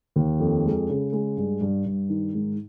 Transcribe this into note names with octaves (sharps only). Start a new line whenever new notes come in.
D#2
F2
G#3
C#3
G#3
G2
G2
G2
D#3
G#2